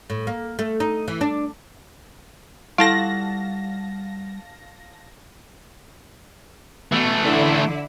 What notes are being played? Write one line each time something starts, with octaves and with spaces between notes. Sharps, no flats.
A2
A#3
A3
D#4
E3
D4
G3 E4 A4 F5 F#5 A5 A#6
B2 E3 A3
D3 E4